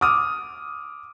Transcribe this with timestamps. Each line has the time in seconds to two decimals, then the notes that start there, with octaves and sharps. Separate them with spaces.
0.01 D6 D#6 F6